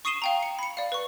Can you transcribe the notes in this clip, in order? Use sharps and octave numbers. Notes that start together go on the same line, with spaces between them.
C#6 D#6 C7 D#7 E7 G7
F5 G5 A#5
C#7
B5 C#7
D5 F5
B4 C#6